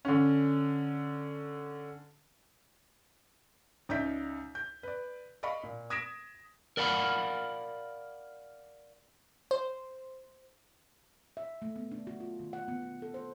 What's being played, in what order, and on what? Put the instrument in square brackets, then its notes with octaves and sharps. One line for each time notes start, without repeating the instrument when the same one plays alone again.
[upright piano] D3 C#4
[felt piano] C#2 D#4 D5 E5 G6 B6
G6
B4 D5
D5 D#5 F5 B5 C#6
A#2
D#6 G#6 A#6 B6 D7 E7
[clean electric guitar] A#4 D5 F5 F#5 B5
[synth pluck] C5
[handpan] E5
A3
B3
D4
F#4
F4
D#3
F#5
B3
B3
A4
C5